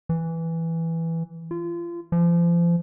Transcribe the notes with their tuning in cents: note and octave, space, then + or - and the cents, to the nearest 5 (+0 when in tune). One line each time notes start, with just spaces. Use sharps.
E3 +0
F4 -30
F3 -35